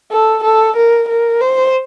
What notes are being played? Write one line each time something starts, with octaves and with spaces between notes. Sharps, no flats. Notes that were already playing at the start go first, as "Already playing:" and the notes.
A4
A4
A#4
A#4
C5